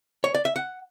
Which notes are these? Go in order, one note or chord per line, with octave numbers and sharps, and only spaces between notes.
C#5
D5
E5
F#5